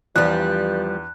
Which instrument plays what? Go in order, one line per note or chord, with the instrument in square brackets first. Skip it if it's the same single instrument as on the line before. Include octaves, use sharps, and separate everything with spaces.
[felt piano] E2 [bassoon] G2 [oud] F3 G3 [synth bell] F#6